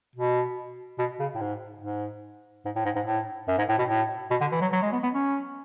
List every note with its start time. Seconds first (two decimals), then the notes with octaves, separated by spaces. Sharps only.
0.16 B2
0.99 B2
1.20 C#3
1.35 A2
1.41 G#2
1.81 G#2
2.65 G#2
2.76 A2
2.85 G#2
2.96 G#2
3.06 A2
3.48 F#2
3.58 G#2
3.69 A2
3.78 B2
3.89 A2
4.31 B2
4.41 D3
4.52 E3
4.61 F#3
4.72 F#3
4.82 G#3
4.92 B3
5.03 B3
5.13 C#4